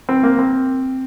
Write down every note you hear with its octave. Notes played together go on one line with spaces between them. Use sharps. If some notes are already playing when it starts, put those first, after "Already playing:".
C4
A#3
C4